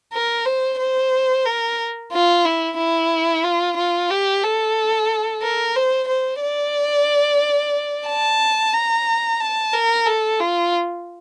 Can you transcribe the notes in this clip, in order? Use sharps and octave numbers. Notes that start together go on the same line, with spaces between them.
A#4
C5
C5
A#4
F4
E4
E4
F4
F4
G4
A4
A#4
C5
C5
D5
A5
A#5
A5
A#4
A4
F4